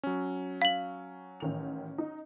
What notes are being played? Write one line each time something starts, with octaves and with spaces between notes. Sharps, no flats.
F#3 C#4
F5 F#7
A1 D#3 F7
D#4